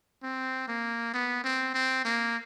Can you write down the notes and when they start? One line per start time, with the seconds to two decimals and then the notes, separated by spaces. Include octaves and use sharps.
0.23 C4
0.68 A#3
1.14 B3
1.44 C4
1.74 C4
2.05 A#3